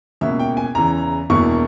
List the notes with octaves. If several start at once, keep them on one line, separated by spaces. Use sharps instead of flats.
C#2 B2 A#3 E5
G5
G#5
E2 C#3 E3 A#5
E1 E2 B2 A#3 E4 C#6